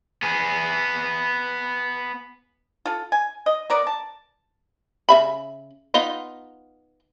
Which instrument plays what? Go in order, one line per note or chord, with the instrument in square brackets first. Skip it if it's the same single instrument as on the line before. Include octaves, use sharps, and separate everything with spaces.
[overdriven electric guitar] B3 G#4
[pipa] F4 A4
G#5
D#5
B3 A#4 D5
A5
[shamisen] C#3 E5 B5
B3 D#4 F4